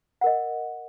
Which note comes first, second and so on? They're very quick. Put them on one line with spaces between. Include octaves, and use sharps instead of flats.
F#5 A#4 D#5